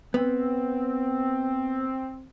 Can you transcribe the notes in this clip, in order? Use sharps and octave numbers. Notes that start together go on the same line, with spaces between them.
B3 C4